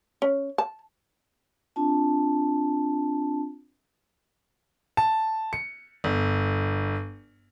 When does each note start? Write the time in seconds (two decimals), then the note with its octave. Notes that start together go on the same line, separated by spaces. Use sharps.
0.22 C#4
0.58 A5
1.76 C4 D4 F4 A5
4.97 A5
5.53 C#7
6.04 G1